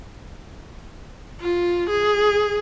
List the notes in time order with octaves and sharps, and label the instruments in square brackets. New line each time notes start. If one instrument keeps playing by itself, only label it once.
[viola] F4
G#4